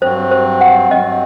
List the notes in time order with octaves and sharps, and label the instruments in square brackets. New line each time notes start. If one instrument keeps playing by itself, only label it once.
[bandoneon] G2 F#3 C4 [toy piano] C5
[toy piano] C5
F#5
[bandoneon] G2 F#3 C4 [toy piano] D#5